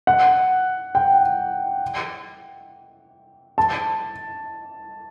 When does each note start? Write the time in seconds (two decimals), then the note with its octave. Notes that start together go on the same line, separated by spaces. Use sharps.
0.07 F#5
0.95 G5
3.58 A5